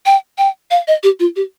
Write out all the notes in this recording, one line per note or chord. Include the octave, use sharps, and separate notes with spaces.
G5
G5
F5
D#5
G4
F4
G4